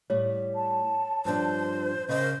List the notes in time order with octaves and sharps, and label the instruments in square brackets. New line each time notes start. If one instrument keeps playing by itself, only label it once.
[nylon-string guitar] A2 G3 [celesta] C#5
[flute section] A5
[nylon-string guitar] G2 F3 D4 [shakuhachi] C5
[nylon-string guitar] C#3 [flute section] A#4 D#5 [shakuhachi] C5